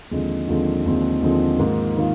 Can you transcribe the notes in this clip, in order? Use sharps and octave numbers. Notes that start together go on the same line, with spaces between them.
D#2 D3 F3 G#3 C4
D#2 D3 F3 G#3 C4
D#2 D3 F3 G#3 C4
D#2 D3 F3 G#3 C4
G#2 D#3 A#3 F4
D#3 A#3 F4